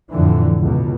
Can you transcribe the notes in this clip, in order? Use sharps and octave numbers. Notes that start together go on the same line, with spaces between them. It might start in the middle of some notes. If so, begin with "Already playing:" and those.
F2 A2 D3 E3
C#2 B2